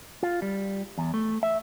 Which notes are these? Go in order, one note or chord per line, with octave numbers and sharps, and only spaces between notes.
F4
G3
E2
A3
E5